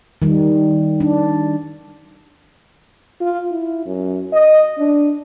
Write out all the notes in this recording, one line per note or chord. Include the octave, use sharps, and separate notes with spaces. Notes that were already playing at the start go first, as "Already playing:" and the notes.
D#3 G3
D4
F4
E4
F#2
D#5
D4